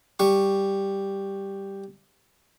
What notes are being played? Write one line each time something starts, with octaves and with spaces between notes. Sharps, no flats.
G3 C#6